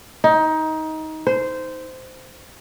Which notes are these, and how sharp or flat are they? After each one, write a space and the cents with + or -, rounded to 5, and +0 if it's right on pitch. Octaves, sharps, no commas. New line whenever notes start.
D#4 +20
C5 -15